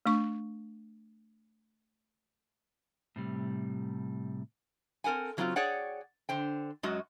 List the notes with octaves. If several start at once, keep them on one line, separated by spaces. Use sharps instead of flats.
A3 D4 C#6
A2 C3 G3
C4 A4 A#4 F#5 G#5
C#3 F#3 C4 D#4 F4
G#4 C#5 D5 F#5 G5
D3 C5 G5
F#2 F#3 G#3 F#4 D#5